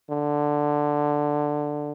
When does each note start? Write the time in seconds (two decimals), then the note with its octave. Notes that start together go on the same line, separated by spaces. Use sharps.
0.10 D3